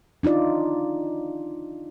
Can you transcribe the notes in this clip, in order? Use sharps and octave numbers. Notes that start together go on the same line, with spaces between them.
D4 D#4 F4 D5